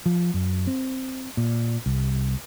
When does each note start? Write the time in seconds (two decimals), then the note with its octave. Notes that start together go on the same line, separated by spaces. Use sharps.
0.06 F3
0.34 F#2
0.67 C4
1.37 A#2
1.86 C2